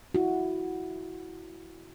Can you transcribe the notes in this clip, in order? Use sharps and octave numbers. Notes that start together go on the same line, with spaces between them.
E4 F#4